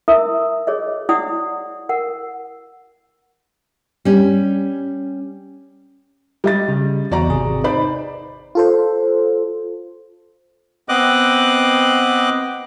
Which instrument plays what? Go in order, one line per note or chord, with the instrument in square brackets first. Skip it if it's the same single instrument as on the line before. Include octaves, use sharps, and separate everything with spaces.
[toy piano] E4 A#4 E5 D#6
G#4 C#5 D#5
E4 D5 F#5 D#6
A#4 F#5
[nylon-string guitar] G3 C#4
[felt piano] G3 D#5 A6
[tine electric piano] C#3
[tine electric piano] E2 [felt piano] F#4 D5 A#5
[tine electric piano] G#1 C3 G#4
[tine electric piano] D#4 [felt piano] C5 D5 B5
[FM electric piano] F4 A4 C5
[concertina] B3 C4 D#5 D6 F#6